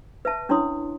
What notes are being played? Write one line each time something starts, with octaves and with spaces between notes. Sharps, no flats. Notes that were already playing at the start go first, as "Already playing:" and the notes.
B4 E5 A5
C#4 D4 E4 C#5 C6 D#6